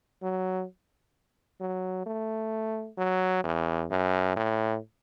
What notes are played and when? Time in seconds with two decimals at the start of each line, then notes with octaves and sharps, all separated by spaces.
0.22 F#3
1.60 F#3
2.06 A3
2.97 F#3
3.44 E2
3.90 F#2
4.36 A2